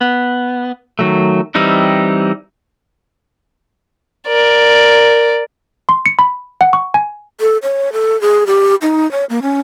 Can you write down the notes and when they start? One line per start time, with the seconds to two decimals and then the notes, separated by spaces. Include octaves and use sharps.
0.01 B3
0.99 D#3 F#3 A3
1.55 E3 G3 C4 D#4 E4
4.28 A#4 D5
5.89 C6
6.06 C#7
6.19 B5
6.61 F#5
6.73 C#6
6.94 G#5
7.41 A4
7.63 C#5
7.93 A4
8.21 G#4
8.47 G4
8.82 D#4
9.11 C#5
9.30 A#3
9.42 C#4